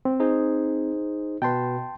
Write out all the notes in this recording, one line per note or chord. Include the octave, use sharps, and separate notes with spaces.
C4
D#4 G#4 C5
B2 B4 G5 A5 C6